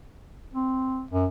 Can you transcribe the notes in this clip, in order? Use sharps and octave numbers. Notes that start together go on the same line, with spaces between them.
C4
F#2